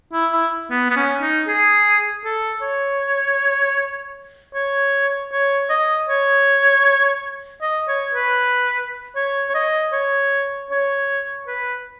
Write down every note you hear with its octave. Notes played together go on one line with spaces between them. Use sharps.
E4
E4
B3
B3
C#4
D#4
G#4
A4
C#5
C#5
C#5
D#5
C#5
D#5
C#5
B4
C#5
C#5
D#5
C#5
C#5
B4